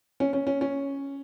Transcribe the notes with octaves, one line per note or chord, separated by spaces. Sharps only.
C#4
C#4
C#4
C#4